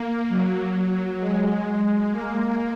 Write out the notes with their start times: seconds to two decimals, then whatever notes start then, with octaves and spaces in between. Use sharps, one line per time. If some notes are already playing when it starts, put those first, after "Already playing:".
Already playing: A#3
0.29 F#3
1.20 G#3
2.11 A#3